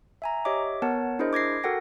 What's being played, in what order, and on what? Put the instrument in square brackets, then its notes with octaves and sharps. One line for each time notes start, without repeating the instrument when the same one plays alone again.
[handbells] E5 G#5 A#5
G4 C#5 D#5 E5 D6
B3 A#4 C#5 F#5 A5
D4 E4 G#4 A#4 C5 D#5
D6 G#6 A#6 C7
F#4 A4 A#4 F#5 G5 A#6